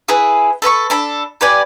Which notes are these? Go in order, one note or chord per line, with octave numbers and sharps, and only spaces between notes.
E4 G#4 B4
A4 B4 E5 C#6
D4 A4 B5
G4 B4 D5 G#5